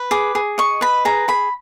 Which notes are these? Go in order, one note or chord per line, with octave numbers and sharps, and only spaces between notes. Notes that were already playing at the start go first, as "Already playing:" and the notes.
Already playing: B4
G#4 D6
G#4
D#5 C#6
B4 B5
G#4 A#5
G#4 B5